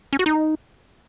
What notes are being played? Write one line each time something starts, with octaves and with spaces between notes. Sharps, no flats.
C#4
F#4
D#4